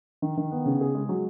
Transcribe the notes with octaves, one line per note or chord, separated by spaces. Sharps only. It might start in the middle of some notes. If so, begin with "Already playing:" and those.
D#3
D#3
B3
C#3
G#4
G#3
F#3